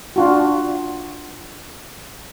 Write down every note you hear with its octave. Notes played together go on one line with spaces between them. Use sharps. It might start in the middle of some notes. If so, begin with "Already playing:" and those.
D4 F4 F#4